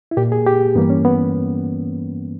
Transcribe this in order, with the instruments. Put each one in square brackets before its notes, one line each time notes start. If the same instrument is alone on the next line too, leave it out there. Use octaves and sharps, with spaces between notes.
[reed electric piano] E4
A#2 A#3 G4
G#4
G4
G2 E3 G3 A#3 B3
C#4
B3